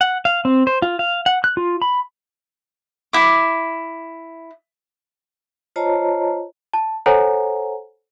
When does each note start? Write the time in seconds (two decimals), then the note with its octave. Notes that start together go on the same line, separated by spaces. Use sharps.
0.01 F#5
0.25 F5
0.45 C4
0.67 C5
0.82 F4
0.99 F5
1.26 F#5
1.44 F#6
1.57 F4
1.82 B5
3.13 E4 D6
5.76 F4 C5 C#5 D#5 A5 A#5
6.73 A5
7.06 A4 C5 C#5 F#5 G#5 A#5